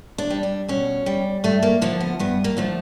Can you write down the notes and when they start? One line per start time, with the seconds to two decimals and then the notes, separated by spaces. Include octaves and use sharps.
0.18 D4
0.30 G3
0.43 D4
0.68 B2 C#4
1.06 G3
1.44 G2 A3
1.63 A#3
1.82 D3 F3 A3 A#3
2.00 B3
2.19 G2 B3
2.44 A#3
2.57 D3 F3 A3